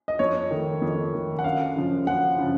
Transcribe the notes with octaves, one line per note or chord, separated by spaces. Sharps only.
D#5
F2 C#5
D#3 A3
F2
D#3 A3
F#5
F#2 F5
C#3 F3
F#2 F#5
C#3 F3